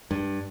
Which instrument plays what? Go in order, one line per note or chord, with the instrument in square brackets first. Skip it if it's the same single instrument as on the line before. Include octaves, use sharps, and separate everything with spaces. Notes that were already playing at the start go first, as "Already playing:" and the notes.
[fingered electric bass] G2